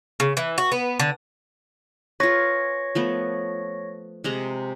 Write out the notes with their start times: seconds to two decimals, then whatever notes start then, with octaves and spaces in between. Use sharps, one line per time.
0.20 C#3
0.37 E3
0.58 F#4
0.72 B3
0.99 D3
2.20 F4 G#4 B4 C#5 C#6 A#6
2.95 F3 A3 B3
4.24 C3 G#3 A#5